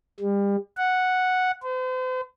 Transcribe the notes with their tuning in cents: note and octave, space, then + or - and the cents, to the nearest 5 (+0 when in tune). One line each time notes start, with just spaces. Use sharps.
G3 +35
F#5 -5
C5 -40